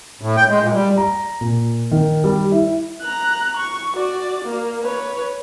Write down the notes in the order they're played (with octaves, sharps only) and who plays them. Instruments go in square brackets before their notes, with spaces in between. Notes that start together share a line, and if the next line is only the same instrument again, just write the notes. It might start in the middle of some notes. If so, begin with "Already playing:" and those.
[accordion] A2
G5
G#3
A#2
G3
[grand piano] A#5
A#2
D#3
G3
E4
[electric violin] A#5 F#6
C#6
F#4 D5
A#3
B4 C#5